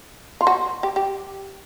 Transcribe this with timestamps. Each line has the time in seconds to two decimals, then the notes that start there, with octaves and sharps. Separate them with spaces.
0.41 F4
0.47 F#4
0.83 G4
0.96 G4